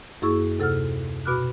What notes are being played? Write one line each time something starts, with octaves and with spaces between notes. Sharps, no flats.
F#2 A#3 E4 G#4 C#6 E6
D#2 C3 A4 F#5 E6 F6
B2 F#4 B5 D6 F6 F#6